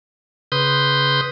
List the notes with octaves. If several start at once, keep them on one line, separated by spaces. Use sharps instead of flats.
C#3 B4 C6 D#6 G6